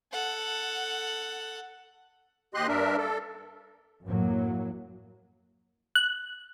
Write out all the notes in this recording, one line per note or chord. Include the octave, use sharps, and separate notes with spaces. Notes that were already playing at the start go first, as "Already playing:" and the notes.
A4 F#5
D#2 G4 D#5 C6 F#6
G2 D4 A#4 E5
A4
F#2 A2 F#3 A#3
F#6